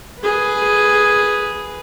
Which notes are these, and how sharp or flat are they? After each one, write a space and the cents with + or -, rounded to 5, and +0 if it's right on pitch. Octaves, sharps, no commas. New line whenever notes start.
G#4 +0 B4 +0